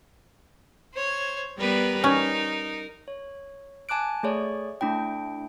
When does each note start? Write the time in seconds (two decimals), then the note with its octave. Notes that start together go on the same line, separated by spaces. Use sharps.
0.94 C5 C#5
1.59 G3 B3 A#4 B4
2.04 C#4 D#4
3.08 C#5
3.89 G#5 A5 D6 F#6 D7
4.23 A3 G#4 C#5 D5 C#6
4.81 A3 D4 E4 G5